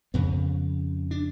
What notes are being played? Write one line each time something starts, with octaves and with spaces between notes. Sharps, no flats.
F2 C#3 B3
D4